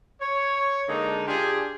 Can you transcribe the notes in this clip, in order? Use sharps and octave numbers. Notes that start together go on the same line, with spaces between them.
C#5
D3 G#3 A#3 D4 D#4
D4 F4 G4 G#4